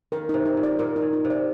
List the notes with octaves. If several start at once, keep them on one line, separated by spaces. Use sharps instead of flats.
D#3 A#4
C3 D#4
D#4
A#2
D5
A#2 A#4
D#4
A#2
D#4
C3
D5